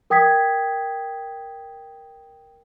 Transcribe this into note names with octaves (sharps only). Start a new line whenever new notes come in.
A#4 G5 D#6 G#6 B6